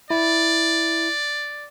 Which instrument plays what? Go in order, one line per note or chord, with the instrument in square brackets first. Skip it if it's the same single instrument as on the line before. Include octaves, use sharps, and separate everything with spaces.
[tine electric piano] E4 [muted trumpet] D5